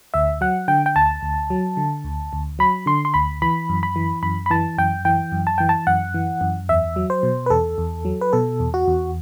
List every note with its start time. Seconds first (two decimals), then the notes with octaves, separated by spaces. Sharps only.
0.14 D2 E5
0.41 F#3 F#5
0.68 D3 G5
0.86 G5
0.96 D2 A5
1.23 D2
1.50 F#3
1.77 D3
2.04 D2
2.33 D2
2.59 F#3 B5
2.86 D3 C6
3.05 C6
3.14 D2 B5
3.42 E3 B5
3.69 F#2
3.83 B5
3.96 E3
4.23 F#2 B5
4.46 B5
4.50 E3 A5
4.78 F#2 G5
5.05 E3 G5
5.32 F#2
5.47 A5
5.58 E3 G5
5.69 A5
5.87 F#2 F#5
6.14 E3
6.41 F#2
6.69 E2 E5
6.96 F#3
7.10 C5
7.23 B2
7.46 B4
7.50 E2 A4
7.78 E2
8.05 F#3
8.21 B4
8.33 B2 A4
8.60 E2
8.74 F#4
8.87 E2